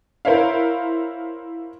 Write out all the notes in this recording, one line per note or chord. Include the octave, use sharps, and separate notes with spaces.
E4 A#4 C5 C#5 E5 F5